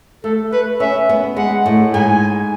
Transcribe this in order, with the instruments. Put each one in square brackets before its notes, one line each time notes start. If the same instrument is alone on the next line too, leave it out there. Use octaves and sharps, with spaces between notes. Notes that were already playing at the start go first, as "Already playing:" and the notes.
[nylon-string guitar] A3 [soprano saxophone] A4
[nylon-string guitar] A3 [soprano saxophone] B4
[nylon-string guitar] C#4 [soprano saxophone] E5
[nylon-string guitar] B3
[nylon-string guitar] G#3 [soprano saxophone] F#5
[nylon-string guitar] A2
[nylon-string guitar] G#2 [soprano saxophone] G#5